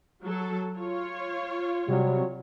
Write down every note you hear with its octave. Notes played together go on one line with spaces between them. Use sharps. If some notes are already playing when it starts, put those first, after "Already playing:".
F#3 A4
F4 C#5
C3 F#3 G3